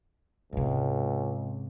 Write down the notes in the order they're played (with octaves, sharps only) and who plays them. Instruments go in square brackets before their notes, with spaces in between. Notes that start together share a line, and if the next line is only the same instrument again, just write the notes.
[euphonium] C#2 [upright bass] G#2 C3